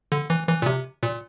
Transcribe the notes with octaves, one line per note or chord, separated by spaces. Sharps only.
D3
E3
E3
A#2
C3
A#2